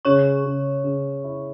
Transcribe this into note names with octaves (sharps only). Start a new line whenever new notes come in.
C#3 C#5 C#6
C#3
C#3
E4